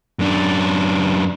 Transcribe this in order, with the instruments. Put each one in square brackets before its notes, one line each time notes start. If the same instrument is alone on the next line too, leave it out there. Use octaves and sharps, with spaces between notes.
[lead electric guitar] F#2 D4